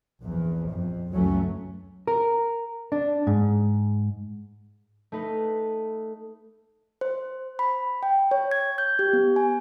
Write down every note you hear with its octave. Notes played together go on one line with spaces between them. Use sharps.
A#1 E2
F2
C#2 F#2 E3 F#3 A3 C#4
A#4
D4
G#2
A3 D#4 B4
C5
B5
G5
C#5
G#6
G6
G4
B3
G#5